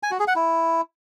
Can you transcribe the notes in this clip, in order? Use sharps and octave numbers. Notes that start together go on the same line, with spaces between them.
G#5
F#4
G#4
F#5
E4